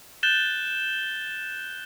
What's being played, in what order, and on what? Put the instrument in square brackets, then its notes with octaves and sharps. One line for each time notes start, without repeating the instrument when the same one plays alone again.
[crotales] F#6 G6 A6 E7 G7